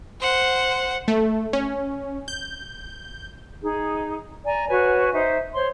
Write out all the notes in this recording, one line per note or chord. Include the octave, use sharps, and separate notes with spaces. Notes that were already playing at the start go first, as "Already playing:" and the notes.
C5 F#5
A3
C#4
G6
D#4 G#4
D5 G#5 A#5
F#4 B4 C#5 G#5
D#4 C5 E5
C5 C#5 C6